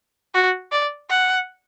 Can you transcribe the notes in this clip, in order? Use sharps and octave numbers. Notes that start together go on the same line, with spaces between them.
F#4
D5
F#5